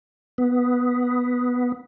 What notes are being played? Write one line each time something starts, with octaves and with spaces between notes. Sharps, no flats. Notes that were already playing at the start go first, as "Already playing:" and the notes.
B3